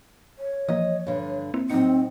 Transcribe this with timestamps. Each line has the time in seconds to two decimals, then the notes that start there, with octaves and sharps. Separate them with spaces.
0.39 C#5
0.68 E3 F3 A#3 D#5
1.07 G2 D3
1.54 A#3 C4 E4
1.70 A2 F#3 C4 D#4 C#7